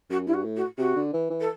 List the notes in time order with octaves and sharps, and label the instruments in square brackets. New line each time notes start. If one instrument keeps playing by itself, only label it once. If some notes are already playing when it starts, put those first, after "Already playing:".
[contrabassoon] F#2 [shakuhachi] F#4
[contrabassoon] G2 [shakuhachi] E4
[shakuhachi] F#4
[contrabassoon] A2
[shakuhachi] F#4
[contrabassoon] C3 [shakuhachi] F#4
[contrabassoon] D3
E3
E3
[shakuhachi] A4